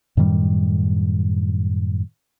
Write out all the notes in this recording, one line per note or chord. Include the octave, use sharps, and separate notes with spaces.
F#2 A2 D#3 G3